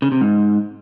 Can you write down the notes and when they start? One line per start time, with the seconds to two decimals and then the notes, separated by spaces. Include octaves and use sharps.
0.02 C#3
0.12 C3
0.21 G#2